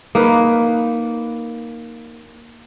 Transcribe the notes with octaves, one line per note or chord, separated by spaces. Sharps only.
A#3 D#4 B4